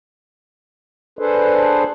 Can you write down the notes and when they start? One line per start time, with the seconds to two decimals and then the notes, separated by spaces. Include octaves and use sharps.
1.19 D4 G#4 A4 B4 C5